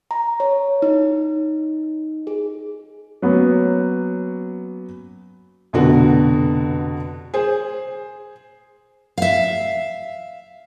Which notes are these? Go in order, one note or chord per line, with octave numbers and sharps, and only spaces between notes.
A#5
C#5
D#4
G#4
F#3 A#3 B3 C#4
F1 B2 D3 F#4
G#4 C5
E5 F5